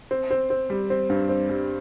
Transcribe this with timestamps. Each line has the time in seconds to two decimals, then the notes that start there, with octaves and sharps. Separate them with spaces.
0.11 C4
0.30 C4
0.50 C4
0.70 G3
0.90 C4
1.10 G2
1.29 C4
1.50 G3